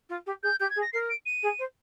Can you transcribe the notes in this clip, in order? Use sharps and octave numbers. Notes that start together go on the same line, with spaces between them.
F4
G4
G#4 G6
G4 G6
G#6
G#4
A#6
A#4 C7
D7
D#7
G#4
C5